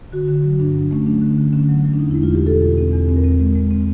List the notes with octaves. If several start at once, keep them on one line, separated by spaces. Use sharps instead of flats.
D3 F#4
D3
F#3
G2 D4
F#3
A3 C#4
F#3 D4
D3
D3
D3 C#4
F#3
F#3
D4
E2 D#4
G#3 E4
F4
E2 G4
B2 A4
E2
C4
E2
C4
A#4
C4
G#3
G#3
C4